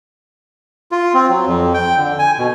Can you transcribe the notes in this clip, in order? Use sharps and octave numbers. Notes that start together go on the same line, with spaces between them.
F4
C4
F#3
F2
G5
D3
G#5
B2